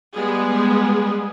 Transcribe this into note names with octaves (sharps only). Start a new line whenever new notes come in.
G3 G#3 B3 G#4